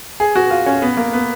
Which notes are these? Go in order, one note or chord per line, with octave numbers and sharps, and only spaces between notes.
G#4
F#4
F4
C#4
B3
A#3
B3